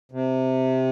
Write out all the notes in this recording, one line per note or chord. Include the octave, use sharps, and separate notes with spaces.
C3